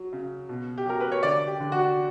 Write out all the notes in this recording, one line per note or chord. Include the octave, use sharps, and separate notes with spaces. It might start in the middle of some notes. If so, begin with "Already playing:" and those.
Already playing: F#3
C#3
B2
G4
F#3 A#4
B4
C#5
D3 D5
G4
D3
F#4